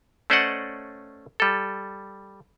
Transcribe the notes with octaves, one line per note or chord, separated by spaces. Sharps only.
A3 C#4 C5 D5 D#5 F#5
G3 A4